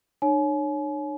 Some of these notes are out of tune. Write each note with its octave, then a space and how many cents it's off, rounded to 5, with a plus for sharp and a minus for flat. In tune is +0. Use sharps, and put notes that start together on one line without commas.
D4 +45 C#5 +0 G#5 +40